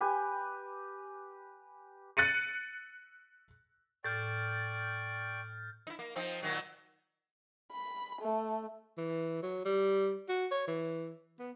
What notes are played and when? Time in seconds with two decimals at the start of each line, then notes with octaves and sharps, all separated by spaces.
0.01 G4 B4 G#5
2.17 F#6 A6 C#7 D#7
4.04 A2 D5 G5 C#6 F6 G6 A6
5.87 D#4 E4
5.99 A#3
6.16 F3 C4 D#4
6.42 A#2 D#3 F#3
7.72 B5
8.22 A3
8.98 E3
9.43 F#3
9.65 G3
10.29 F#4
10.52 C#5
10.68 E3
11.39 B3